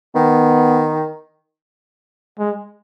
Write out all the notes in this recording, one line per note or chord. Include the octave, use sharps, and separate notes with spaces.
D#3 B3
G#3